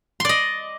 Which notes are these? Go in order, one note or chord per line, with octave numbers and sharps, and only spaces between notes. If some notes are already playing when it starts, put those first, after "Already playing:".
D5 D#5 C6